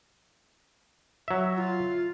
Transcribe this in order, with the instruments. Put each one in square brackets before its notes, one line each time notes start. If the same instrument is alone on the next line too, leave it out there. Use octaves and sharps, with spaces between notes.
[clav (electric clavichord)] F#3 E5
[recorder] F4